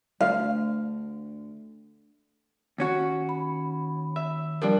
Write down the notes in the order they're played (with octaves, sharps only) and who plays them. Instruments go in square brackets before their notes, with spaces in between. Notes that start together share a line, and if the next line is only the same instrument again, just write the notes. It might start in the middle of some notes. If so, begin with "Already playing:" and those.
[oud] D2 [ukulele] F5
[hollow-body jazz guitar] D#2 C#4 F#4
[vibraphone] B5
[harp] E5
[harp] F3 G3 D4 [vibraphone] A#4